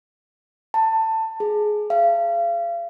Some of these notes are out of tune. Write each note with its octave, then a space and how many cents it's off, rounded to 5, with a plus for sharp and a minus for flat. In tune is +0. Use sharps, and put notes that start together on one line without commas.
A5 +20
G#4 +15
F5 -35